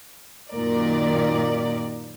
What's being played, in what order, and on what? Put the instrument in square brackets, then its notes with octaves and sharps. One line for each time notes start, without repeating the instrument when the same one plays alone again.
[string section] F#2 A#2 D#3 A#4 D5